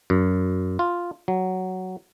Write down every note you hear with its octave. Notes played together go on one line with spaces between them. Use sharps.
F#2
F4
F#3